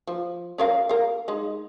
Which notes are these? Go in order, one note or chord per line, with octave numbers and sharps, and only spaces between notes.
F3
C#4 A#4 F5
A#4 F5
G#3 D#4